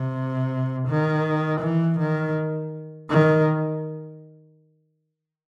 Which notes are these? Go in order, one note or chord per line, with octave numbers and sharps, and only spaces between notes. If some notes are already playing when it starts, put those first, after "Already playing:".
Already playing: C3
D#3
E3
D#3
D#3